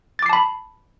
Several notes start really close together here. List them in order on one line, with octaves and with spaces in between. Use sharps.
A6 D6 C7 A5 B5